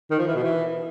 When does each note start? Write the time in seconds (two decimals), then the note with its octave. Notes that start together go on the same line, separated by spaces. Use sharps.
0.10 D#3
0.19 F3
0.27 E3
0.35 B2
0.43 E3